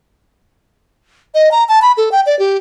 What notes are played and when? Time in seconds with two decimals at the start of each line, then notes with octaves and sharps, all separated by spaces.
1.35 D#5
1.52 A#5
1.69 A5
1.82 B5
1.97 A4
2.12 G5
2.26 D5
2.39 G4